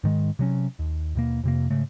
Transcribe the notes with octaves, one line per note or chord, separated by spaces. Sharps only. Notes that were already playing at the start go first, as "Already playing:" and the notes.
G#2 D#3 G#3
C3 F#3 C#4
D#2
D#2 B2 A#3
F2 C3 A#3
G#2 C#3 A3